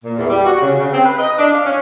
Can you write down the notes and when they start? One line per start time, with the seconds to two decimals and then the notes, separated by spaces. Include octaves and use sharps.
0.03 A#2
0.18 E2
0.29 G3
0.45 F#4
0.61 C#3
0.78 C#3
0.92 C4
1.04 B4
1.18 D#5
1.38 D4
1.52 F5
1.65 C#4